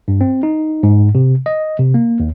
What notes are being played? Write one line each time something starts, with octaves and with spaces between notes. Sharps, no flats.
G2
C4
D#4
G#2
C3
D#5
C3
A#3
D#2